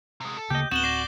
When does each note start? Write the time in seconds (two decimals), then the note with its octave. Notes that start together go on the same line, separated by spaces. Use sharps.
0.21 C3 G#3
0.37 A4
0.50 D2 C#3 A#3 G4 D#5 G6
0.71 D1 B3 C4 F#4 E7 F#7 G7
0.84 D5 A#6 C7